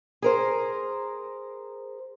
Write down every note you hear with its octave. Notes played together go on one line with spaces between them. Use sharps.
G#4 A#4 C5